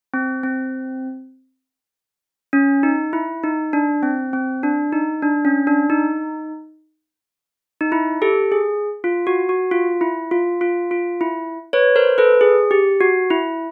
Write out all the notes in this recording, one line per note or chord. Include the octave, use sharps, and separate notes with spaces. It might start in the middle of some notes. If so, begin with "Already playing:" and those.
C4
C4
C#4
D#4
E4
D#4
D4
C4
C4
D4
D#4
D4
C#4
D4
D#4
D#4
E4
G4 A4
G#4
F4
F#4
F#4
F4
E4
F4
F4
F4
E4
B4 C#5
A#4 C5
A4 B4
G#4
G4
F#4
E4